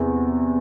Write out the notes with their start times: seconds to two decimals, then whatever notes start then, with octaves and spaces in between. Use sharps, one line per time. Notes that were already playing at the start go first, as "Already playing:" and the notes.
Already playing: E2 C3